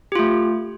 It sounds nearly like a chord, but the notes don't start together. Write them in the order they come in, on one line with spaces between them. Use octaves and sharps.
G4 F4 A3